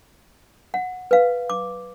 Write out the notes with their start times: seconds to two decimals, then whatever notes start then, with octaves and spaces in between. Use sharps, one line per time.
0.74 F#5
1.11 B4 F5
1.50 D6